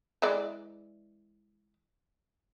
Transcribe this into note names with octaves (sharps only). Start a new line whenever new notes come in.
E3 G#3 D5